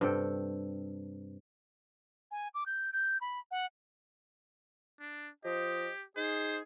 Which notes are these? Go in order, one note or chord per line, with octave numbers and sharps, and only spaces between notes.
G2 C3 A4 G5
G#5
D6
G6
G6
B5
F#5
D4
F3 G4 C5 D#5
D#4 G#4 C5